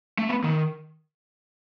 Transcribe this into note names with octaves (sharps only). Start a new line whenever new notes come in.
A3
B3
D#3